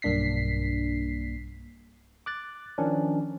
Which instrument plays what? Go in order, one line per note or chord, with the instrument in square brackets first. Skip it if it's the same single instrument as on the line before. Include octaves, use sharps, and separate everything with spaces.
[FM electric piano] B1 G2 A#3 D4 B6 C7
[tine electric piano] D6 F#6 A6
D#3 F3 C#4 D4